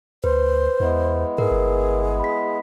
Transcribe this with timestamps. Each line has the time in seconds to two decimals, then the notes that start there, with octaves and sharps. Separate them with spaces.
0.24 D2 B4 C5
0.80 E2 G#3 B3 E4
1.38 G#2 G#4 A#4 B4
1.51 G1
2.20 B5 B6